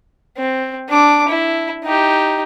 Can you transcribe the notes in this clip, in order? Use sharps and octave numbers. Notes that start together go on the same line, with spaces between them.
C4
D4 D6
E4
D#4 G4